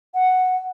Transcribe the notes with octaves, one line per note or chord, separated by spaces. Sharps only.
F#5